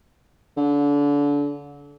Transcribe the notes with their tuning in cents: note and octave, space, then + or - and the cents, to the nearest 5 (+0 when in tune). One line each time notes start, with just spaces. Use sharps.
D3 -30